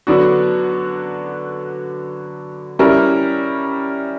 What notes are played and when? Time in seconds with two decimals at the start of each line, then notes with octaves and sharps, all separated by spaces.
0.07 D3 F#3 B3 D4 F#4
2.79 G3 C#4 E4 A#4